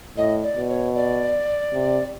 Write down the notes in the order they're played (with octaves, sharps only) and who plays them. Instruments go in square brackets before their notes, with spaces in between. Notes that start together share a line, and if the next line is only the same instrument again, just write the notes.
[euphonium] A2 [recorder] D#5
[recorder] D5
[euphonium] B2
[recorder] C#5
D5
[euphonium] C3